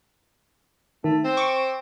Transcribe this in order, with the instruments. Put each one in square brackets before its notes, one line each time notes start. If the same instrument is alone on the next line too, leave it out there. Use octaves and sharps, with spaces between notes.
[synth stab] D#3 [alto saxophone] A3
[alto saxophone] C4
[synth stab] C#6 D6